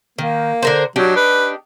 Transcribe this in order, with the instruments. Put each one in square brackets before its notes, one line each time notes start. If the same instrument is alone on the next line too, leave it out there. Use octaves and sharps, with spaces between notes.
[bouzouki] D#3 [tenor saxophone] A#3
[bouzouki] D3 A#4 C5
[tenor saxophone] F#3 [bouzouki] D4 D#4 G4
[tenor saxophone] B4